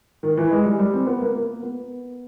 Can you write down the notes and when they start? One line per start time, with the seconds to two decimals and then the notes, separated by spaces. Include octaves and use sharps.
0.23 D#3
0.37 E3
0.51 G#3
0.65 G3
0.79 G3
0.93 C4
1.07 B3
1.21 A#3
1.35 A#3
1.62 B3